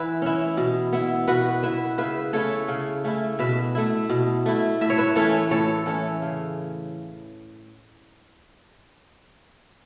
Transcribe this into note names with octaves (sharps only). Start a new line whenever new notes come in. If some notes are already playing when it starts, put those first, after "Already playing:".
Already playing: E3 E4 B4 E5 F#5
C#4 E4
B2
B3 E4
B2 F#4 B4
B3 E4 B4 E5
C#3 B4 E5
A3 C#4 E4 A4 C#5
C#3
A3 C#4 E4
B2 B4 E5
A3 E4
B2
A3 E4
A2 E5
C#5
B4 E5
E3 A3 C#4 A4 C#5
A2 A4 C#5
E3 A3 C#4
C#3